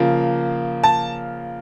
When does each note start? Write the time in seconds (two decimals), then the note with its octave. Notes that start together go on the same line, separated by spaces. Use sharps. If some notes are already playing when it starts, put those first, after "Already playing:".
Already playing: C#3 F3 A#3
0.84 A5